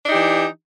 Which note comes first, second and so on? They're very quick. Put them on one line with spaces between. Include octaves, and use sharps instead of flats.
D4 D#4 G4 E3